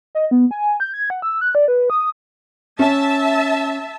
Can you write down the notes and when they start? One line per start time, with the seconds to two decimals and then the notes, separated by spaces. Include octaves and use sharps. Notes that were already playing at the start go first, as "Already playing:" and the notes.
0.15 D#5
0.31 B3
0.51 G#5
0.80 G6
0.94 G#6
1.10 F#5
1.22 E6
1.41 F#6
1.55 D5
1.68 B4
1.90 D#6
2.79 C#4 E5 A5